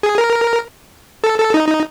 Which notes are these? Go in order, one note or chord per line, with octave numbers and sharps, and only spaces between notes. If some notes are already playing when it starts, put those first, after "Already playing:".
G#4
A#4
A4
A4
D#4
D#4